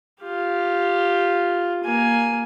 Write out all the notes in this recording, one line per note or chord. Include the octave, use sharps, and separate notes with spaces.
F4 G4
A#3 G#5